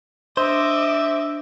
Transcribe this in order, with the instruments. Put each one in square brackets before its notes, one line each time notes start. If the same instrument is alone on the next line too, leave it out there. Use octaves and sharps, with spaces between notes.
[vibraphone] D4 [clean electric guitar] C5 [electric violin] D#5 D6 [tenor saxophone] E5